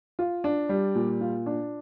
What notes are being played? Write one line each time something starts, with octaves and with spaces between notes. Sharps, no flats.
F4
D4
G3
A#2
F4
D4